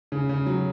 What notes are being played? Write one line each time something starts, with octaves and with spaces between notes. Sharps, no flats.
C#3
C#3
F#3